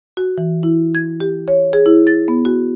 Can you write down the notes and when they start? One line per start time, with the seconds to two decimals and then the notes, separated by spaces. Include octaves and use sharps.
0.17 F#4
0.38 E3
0.63 E4
0.95 G#6
1.20 G4
1.48 C#5
1.73 G#4
1.86 E4
2.07 A6
2.28 B3
2.45 F#4